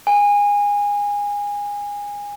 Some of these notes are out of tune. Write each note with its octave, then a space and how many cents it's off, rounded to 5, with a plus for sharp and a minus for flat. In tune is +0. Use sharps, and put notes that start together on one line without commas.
G#5 -25